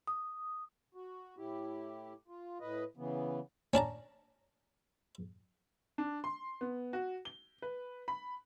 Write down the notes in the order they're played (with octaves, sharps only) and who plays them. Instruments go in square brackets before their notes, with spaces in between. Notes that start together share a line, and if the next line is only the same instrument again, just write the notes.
[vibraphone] D#6
[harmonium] F#4
A2 E4 G4
F4
A2 B4 D#5
C#3 E3 B3
[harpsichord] C#4 D4 A5 A#5
[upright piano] D4
C6
B3
F#4
G7
B4
B5